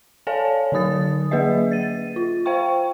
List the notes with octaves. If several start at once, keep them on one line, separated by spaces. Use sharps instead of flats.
A4 C#5 D5 F5 G#5 A5
D3 F#3 D#4 D#6 A6
F#3 A#3 G#4 B4 D#5 E5
A6 D#7
F4
C5 F5 G5 C#6